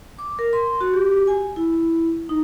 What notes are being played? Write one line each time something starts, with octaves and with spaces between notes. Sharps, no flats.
D6
A#4
C6
F#4
G4
G#5
E4
D#4